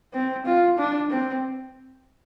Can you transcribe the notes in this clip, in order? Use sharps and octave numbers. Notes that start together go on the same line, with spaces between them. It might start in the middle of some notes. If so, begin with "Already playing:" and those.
C4
F4
D4
C4